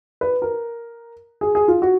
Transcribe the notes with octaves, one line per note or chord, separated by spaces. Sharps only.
B4
A#4
G#4
G#4
F4
F#4